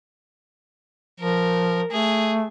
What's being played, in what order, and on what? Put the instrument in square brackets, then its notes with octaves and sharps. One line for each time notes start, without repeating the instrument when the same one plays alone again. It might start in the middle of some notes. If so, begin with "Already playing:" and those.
[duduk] F3 [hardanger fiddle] A#4
[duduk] A3 [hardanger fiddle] G#4